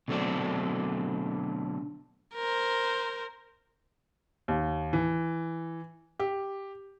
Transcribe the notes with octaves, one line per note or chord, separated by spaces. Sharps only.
B2 D3 F#3 A3 C4 D4
A#4 C5
D#2
E3
G4